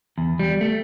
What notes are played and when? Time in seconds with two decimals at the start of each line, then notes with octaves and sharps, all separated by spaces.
0.18 E2
0.39 G3
0.61 A3